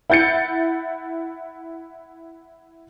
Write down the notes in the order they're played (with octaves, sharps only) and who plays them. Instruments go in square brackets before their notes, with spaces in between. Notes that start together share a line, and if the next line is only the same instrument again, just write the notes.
[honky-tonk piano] E4 F#5 G6 A6 C#7